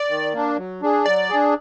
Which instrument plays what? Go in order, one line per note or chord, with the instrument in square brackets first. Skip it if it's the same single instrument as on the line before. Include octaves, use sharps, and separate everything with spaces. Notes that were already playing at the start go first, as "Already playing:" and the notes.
Already playing: [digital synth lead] D5
[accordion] D#3
A#3 D4
F#3
D4 G#4
[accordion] F#3 [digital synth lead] D5
[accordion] D4 G#4